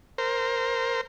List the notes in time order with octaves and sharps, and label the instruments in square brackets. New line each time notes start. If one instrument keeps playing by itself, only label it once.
[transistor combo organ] A#4 C5